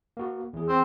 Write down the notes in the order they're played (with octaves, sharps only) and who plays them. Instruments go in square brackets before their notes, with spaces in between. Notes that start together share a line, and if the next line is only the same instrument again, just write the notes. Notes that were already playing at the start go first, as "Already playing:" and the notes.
[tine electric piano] A#3 F#4
E2 G#4
[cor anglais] C4